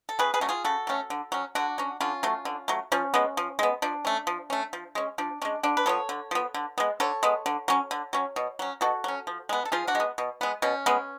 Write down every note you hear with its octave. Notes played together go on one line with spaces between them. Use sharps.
A4
C#3 G#4 B4
G#4 B4
F#3 A3 C#4
F4 G#4
C#3 F#4 A4
F#3 A3 C#4
D3
F#3 C#4
D3 D4 F#4
F#3 C#4
D3 C#4 F4
F#3 A3
D3
F#3 A3
F3 C#4
G#3 B3
F3
G#3 B3
F3 D4
A3 C#4
F3
A3 C#4
F3
G#3 C#4
F3 D4
G#3 C#4 D4
D3 D4
B4
F3 B3 A4 C#5
D3
F3 B3
D3
G#3 B3
D3 A4 C#5
G#3 B3
D3
F#3 C#4
D3
F#3 C#4
B2
F#3 C#4
B2 F#4 A4
F#3 C#4
F3
G#3 B3
A4
F3 F4 G#4
D4 F#4
G#3 B3
B2
G#3 B3
B2 C#4
G#3 B3